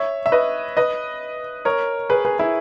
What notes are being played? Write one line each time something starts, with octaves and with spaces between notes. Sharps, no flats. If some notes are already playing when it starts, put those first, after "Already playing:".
Already playing: C#5 E5
E5
B4 D#5
B4 D#5
A#4 C#5
G#4 B4
G#4 B4
E4 G#4